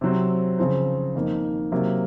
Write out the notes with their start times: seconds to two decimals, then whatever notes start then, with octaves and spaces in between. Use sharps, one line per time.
0.01 C3 F#3 C4
0.59 C#3 F3 C4
1.15 F2 D#3 A#3
1.72 C3 F#3 A#3